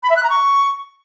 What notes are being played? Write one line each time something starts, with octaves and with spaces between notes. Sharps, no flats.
B5
E5
F#6
A#5
C#6